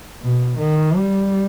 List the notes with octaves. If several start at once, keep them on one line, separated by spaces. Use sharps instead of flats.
B2
D#3
G3